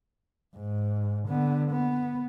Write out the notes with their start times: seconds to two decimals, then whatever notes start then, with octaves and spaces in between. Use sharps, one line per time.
0.56 G#2
1.28 D3 B3
1.71 B3